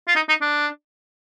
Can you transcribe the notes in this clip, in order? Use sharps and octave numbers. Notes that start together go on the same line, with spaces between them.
F4
D#4
D#4
D4